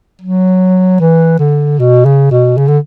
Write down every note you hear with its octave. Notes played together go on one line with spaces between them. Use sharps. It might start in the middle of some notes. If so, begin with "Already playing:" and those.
F#3
E3
D3
B2
C#3
B2
C#3
D3